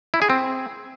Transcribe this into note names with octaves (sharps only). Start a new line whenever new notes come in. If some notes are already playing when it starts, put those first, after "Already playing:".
E4
G#4
C4